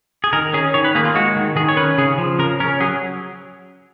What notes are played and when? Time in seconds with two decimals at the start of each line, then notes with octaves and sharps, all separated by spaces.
0.24 G#4
0.33 D#3 A#4
0.54 C#4 G#4
0.74 D#3 C#5
0.85 B4
0.95 A#3 G#4
1.05 F4
1.15 G#3 F#4
1.36 D#3
1.56 D#3 G#4
1.69 C#5
1.77 C#4 B4
1.98 C#3 G#4
2.18 F3
2.38 C#3 A#4
2.60 C#4 A#4
2.80 F#3 G#4